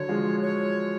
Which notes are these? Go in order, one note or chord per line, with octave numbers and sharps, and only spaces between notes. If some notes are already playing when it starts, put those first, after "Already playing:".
Already playing: D3 F#3 C#5
F3 G#3
C#5